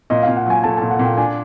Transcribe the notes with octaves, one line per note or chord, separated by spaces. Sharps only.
A#2 D#5
A#2 F5
F#5
F#3 G#5
A3 A5
A#2 A5
F#5
A#2
G5
D4 G#5